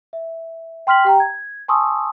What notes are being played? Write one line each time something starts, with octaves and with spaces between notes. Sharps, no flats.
E5
G5 C6 F6 B6 F#7
G4 G5 A#5
G#6
G#5 A5 C6 C#6 D#6 E6